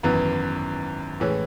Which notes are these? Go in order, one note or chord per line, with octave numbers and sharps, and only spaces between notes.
G#1 F#2 E3 B3
A2 E3 G#3 C#4 E4